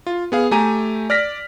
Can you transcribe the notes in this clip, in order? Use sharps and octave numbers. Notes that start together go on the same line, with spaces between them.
F4
B3 G#4 F5
A3 G4 G#5 A#5 D#7
D5 F6 A#6 B6